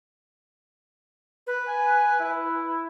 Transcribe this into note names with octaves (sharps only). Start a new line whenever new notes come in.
B4
G#5
E4